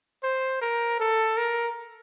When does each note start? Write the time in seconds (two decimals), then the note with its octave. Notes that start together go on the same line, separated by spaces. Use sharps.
0.23 C5
0.61 A#4
1.00 A4
1.37 A#4